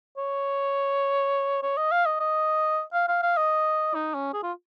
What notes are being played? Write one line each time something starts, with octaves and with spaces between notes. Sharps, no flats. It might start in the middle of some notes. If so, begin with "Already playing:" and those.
C#5
C#5
D#5
F5
D#5
D#5
F5
F5
F5
D#5
D#4
C#4
G#4
F4